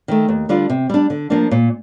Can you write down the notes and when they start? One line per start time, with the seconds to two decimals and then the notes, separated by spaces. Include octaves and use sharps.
0.08 D#3 A3
0.28 D#2
0.49 D3 G3 D4 F4
0.69 C3
0.89 G3 D4
1.10 D3
1.30 F3 A#3 D4
1.51 A#2